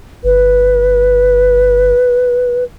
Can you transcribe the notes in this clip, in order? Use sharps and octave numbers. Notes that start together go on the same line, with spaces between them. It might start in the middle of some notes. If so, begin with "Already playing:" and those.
G1 B4